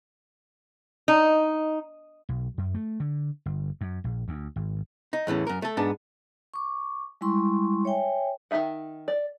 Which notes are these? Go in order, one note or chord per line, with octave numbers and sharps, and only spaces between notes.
D#4
B1
F#2
A3
D3
G1
F#2
A#1
D2
G#1
D#4
E2 A2 E3 C#4
F#2 A#4
A3 A4
G#2 B3 D4 A5
C#6 D6
G3 G#3 E4 C6 C#6
C#5 E5 G5 G#5
D#3 C#4 D#4 E5 F#5
D5